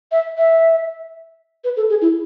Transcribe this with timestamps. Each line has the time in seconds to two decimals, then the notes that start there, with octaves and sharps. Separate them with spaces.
0.12 E5
0.37 E5
1.64 B4
1.76 A4
1.90 G#4
2.02 E4